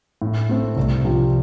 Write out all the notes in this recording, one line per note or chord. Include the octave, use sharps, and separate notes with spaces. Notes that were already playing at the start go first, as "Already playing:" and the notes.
A2
A3 C4
C2
C3 F3